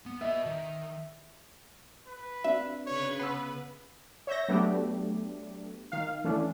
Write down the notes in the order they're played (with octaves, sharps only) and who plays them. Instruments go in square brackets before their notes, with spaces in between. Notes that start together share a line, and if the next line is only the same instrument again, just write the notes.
[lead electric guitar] B3
[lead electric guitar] B4 D#5 [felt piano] E5
[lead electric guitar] D#3
[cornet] B4
[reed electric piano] C4 D4 F#4 [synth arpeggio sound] E5
[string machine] C#3 B4 [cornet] C#5
[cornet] B3 [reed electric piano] B5 E6 [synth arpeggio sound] C6
[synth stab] C#5 E5 G6 A#6
F#3 A3 B3 D4 G4
D#3 F5
E3 A3 C#4 D4